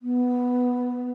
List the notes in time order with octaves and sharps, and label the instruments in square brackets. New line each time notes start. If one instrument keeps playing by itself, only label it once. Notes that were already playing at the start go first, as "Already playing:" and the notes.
[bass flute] B3